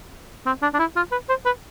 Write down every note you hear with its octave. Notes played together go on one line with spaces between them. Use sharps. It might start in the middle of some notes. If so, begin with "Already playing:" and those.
C4
D4
D4
E4
F4
B4
C5
B4